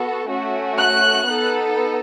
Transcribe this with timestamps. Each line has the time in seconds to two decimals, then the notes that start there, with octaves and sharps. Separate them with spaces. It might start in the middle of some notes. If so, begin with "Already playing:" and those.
Already playing: B3 F#4 A4
0.27 A3 C#4 F#4
0.77 F#6
1.26 B3 D#4 A4